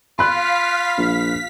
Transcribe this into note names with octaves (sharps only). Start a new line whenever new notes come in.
F4 F5 B5 F#6 B6
A#1 B6